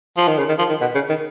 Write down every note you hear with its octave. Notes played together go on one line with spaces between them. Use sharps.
F3
D#3
C#3
D#3
F3
D#3
B2
C#3
D#3